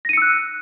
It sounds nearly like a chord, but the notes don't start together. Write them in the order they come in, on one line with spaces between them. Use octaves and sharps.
A#6 D#7 C#7 E6 F#6